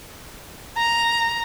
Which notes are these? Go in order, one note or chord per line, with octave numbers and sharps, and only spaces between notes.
A#5